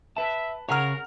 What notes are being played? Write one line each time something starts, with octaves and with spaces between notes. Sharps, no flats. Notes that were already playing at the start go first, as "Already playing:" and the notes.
B4 E5 A5
C#3 G#4 A#4 C#5 F#5 A#5 F6